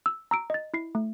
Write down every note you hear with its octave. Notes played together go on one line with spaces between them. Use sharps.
E6
A#5 E6 D7
D#5 A6
E4 C7
A3